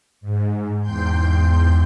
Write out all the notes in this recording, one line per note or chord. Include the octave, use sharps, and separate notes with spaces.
G#2
E2 G#2 G5 C6 G6